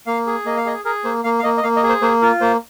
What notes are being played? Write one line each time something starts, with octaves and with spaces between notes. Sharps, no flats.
A#3 F5
G#4
A#3 D#5
F5
G#4 D#5
G#4 A#4
A#3 C5
A#3 F5
F5
A#3 D#5
D#5
A#3 F5
D#5
G#4
C5
A#3 C5
F4 A#4
A#3 C5